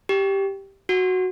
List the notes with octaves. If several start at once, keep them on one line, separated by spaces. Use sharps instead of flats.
G4
F#4